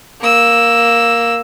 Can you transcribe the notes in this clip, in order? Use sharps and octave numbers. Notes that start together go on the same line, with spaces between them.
A#3 E6